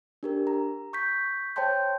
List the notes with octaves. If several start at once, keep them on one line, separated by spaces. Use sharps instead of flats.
D4 G4 A#4
A#5
C#6 G6 B6
C5 C#5 G5 A5 C6 G6